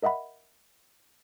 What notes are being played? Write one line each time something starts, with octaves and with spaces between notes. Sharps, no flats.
A#4 D#5 E5 F#5 B5